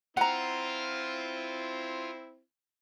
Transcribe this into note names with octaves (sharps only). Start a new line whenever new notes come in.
C4 E4 F4 F#5 A#5